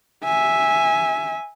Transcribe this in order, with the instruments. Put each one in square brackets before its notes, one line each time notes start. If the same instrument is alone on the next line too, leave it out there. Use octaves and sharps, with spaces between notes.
[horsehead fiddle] E5 G#5